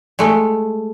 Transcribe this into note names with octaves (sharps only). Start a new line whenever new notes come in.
G#3 A3